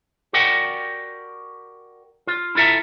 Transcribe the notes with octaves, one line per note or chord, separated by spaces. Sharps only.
F#4 G4 A#4 D5 F#5 G5
F4
E4 F4 A4 E5 A#5